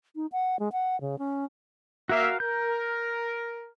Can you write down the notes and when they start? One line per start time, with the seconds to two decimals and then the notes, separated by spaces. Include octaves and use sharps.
0.16 D#4
0.32 F#5
0.59 G#3
0.72 F#5
1.01 C#3
1.19 C#4
2.09 A#3 F#4 A#4 E5 F5
2.40 A#4 G6